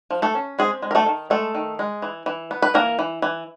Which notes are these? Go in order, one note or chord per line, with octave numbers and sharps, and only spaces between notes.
F3
A3 A4
C#4
G#3 C4 G#4
G#3
A#4
A3 A4
D#3
G#3 A3 A4
D#3
G#3
E3
E3
B3
B4
E3 A#3 A#4
E3
E3